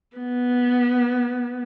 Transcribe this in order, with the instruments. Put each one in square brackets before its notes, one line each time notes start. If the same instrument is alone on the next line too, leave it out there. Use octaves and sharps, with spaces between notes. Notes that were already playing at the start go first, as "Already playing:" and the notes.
[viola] B3